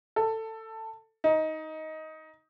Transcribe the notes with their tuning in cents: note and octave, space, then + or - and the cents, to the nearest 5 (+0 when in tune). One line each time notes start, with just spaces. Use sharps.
A4 +15
D#4 +15